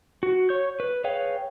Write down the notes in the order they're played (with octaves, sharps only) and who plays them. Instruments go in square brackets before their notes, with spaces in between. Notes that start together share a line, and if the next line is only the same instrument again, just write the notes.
[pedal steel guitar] F#4
C#5 G6
B4
G#4 B4 C#5 F5 G5